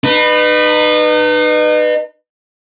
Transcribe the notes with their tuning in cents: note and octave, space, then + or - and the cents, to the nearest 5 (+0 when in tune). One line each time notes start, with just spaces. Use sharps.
D#4 -35 B4 +0